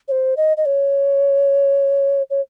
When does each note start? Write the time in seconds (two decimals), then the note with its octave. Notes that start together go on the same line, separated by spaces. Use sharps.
0.08 C#5
0.11 C5
0.37 D#5
0.57 D#5
0.66 C#5
2.30 C#5